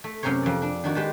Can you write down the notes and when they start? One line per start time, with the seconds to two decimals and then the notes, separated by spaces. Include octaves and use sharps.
0.04 A3
0.23 F#2 C3 C#4 A#4 C5 C#5
0.43 F2 D5
0.62 D4
0.84 D#3 D4 F#4
0.95 G#3 G4 B4 A5